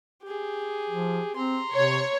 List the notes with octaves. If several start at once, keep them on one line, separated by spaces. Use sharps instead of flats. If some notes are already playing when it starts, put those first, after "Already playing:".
G4 G#4
F3
C4 A#5 C6
C3 C#5